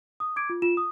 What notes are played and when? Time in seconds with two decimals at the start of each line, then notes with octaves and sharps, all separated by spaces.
0.20 D#6
0.36 D6 G#6 D7
0.50 F4
0.62 F4 E7
0.77 D#6